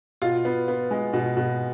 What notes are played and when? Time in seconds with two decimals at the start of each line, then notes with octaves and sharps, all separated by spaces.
0.22 B2 F4
0.45 B3
0.68 B3
0.91 G#3
1.13 B2
1.37 B2